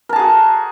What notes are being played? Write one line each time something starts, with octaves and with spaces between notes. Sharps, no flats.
F#4 G#4 A#4 A5